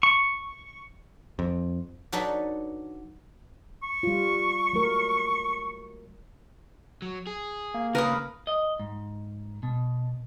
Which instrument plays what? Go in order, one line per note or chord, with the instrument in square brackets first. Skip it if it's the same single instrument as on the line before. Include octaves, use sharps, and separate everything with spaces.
[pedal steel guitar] C#6
[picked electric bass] F2
[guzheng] F#3 D4 D#4 A4 B4
[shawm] C#6
[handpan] G3 F4
F#3 A3 A#4
[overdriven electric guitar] F#3
G#4
[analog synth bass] A#3
[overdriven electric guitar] D#2 C#3 [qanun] A#4 [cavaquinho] B4 A#5 D#6
[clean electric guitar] D#5
G#2
B2